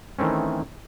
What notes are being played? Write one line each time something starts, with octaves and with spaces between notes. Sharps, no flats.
D#3 E3 A3 C4 C#4